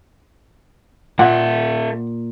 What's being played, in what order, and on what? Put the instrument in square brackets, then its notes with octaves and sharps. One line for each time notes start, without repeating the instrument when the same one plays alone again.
[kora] A#2 [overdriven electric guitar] A#3 E5 [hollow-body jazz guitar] F#5